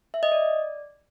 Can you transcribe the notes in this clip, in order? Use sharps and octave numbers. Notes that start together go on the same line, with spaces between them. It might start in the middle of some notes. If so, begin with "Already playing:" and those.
E5
D#5
D5